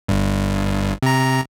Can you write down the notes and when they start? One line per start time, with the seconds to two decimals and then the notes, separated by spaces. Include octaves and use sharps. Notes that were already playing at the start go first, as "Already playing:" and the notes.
0.08 G1 G2
1.03 C3 A#5